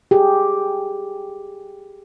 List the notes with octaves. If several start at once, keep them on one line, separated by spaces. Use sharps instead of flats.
G4 G#4